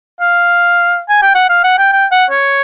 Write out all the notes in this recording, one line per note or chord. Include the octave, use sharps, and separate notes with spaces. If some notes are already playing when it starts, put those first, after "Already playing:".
F5
G#5
G5
F#5
F5
F#5
G5
G5
F#5
C#5